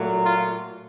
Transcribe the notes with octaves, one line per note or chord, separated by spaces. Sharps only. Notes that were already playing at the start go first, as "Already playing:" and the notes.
Already playing: A#2 F#3 A3
F4